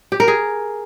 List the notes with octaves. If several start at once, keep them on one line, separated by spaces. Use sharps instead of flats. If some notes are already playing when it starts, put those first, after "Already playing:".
G4
A#4
G#4